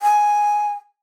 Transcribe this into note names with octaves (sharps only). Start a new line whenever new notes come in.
G#5